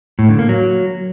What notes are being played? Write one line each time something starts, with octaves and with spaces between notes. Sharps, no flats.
A2
D3
A#3
F#3